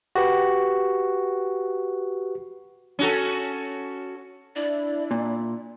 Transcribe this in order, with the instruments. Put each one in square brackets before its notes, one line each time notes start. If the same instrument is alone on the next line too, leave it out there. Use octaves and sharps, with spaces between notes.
[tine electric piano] F#4 G4 B4
[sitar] C#4 F#4 A4
[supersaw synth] D4 E4 [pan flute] D5
[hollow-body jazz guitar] A#2